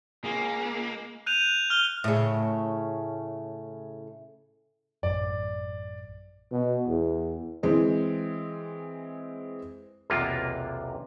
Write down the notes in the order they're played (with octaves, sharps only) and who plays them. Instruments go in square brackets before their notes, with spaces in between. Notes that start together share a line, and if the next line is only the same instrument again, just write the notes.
[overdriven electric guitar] C#2 G#4 [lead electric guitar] A#3
[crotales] F#6 G6 D#7 F7
F6 G7
[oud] A2 C#3
[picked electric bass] A1 F#2 [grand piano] D5
[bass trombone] B2
E2
[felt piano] E3 G#3 C4
[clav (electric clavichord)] B1 E2 C3 A#3 D4 F4